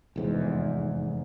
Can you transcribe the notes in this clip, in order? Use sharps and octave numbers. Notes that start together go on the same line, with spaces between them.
F1 E2 G#2